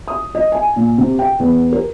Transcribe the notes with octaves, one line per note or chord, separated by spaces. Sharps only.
D#6
D#5
G#5
A#2
C3
G5
E2
A#4